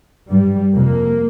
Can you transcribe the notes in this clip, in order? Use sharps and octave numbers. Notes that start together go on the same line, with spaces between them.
G2 G3
F2 C3 A#3